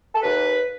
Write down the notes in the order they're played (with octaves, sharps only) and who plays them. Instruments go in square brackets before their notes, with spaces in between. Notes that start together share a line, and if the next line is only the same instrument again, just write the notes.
[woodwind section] A4
D#2 B4